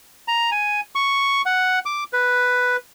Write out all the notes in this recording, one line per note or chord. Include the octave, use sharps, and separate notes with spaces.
A#5
G#5
C#6
F#5
D6
B4